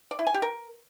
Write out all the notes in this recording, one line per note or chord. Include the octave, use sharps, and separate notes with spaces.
D5
E4
G#5
G4
A#4